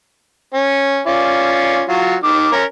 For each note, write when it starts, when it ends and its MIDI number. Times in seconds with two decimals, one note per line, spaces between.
0.54 1.00 61
1.07 1.81 61
1.07 1.81 65
1.07 1.81 74
1.89 2.14 54
1.89 2.14 65
1.89 2.14 66
2.24 2.52 51
2.24 2.52 86
2.52 2.63 61
2.52 2.63 70